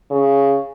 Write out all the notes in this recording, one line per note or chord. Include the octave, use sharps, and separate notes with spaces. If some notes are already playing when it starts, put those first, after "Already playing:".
C#3